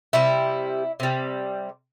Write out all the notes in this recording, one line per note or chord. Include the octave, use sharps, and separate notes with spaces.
C3 G3 E4
C3 G3